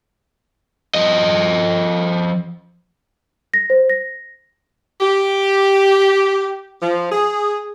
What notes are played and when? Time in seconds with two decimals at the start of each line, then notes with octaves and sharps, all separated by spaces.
0.95 F3 D#5
3.54 A#6
3.70 C5
3.90 A#6
5.00 G4
6.82 F3
7.11 G#4